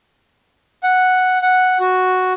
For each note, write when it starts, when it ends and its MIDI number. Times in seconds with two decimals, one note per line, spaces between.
0.84 1.38 78
1.42 1.78 78
1.80 2.33 66